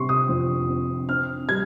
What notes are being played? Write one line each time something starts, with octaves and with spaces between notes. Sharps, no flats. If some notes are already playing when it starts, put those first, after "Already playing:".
Already playing: C3 G3 C6 C#6
D#6
F2
C4
C4 F6
G3 G#6